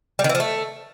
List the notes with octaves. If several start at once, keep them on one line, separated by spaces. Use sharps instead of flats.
G3
D#3
E3
F3
A3